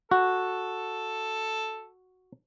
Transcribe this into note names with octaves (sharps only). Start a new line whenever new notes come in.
F#4 A4